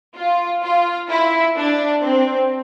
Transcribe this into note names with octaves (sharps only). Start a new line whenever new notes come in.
F4
F4
E4
D4
C4